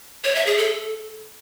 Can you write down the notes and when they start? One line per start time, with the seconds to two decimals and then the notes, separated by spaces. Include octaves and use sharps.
0.24 C#5
0.35 E5
0.46 G#4
0.58 A4